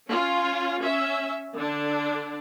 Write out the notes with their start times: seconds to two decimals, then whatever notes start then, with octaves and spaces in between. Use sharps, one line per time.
0.10 C#4 F4
0.80 C#4 E5
1.55 D3 D4